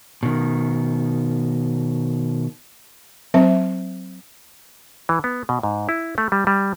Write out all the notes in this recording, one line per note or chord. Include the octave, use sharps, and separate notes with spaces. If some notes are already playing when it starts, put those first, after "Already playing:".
B2 D#3
F#3 C4 C5 E5
E3
B3
B2
G#2
E4
A3
G3
G3